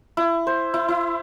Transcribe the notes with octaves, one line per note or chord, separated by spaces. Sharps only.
E4
C5
E4
E4